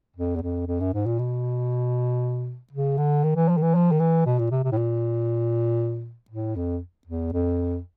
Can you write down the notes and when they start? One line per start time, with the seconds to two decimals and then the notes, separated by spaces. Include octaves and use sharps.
0.16 F2
0.36 E2
0.42 F2
0.67 F2
0.80 F#2
0.94 G#2
1.06 A#2
1.19 B2
2.73 C#3
2.98 D3
3.24 D#3
3.36 E3
3.49 F3
3.58 D#3
3.62 E3
3.75 F3
3.92 D#3
4.00 E3
4.26 B2
4.39 A#2
4.51 C3
4.64 C3
4.72 A2
4.77 A#2
6.30 A2
6.56 F2
7.07 E2
7.33 F2